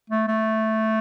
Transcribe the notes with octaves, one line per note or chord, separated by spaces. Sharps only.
A3
A3